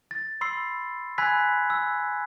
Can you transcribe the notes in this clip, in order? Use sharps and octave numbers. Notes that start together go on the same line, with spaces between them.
A6
B5 C6 E6 C7
G#5 B5 E6 F#6 G#6 B6
E6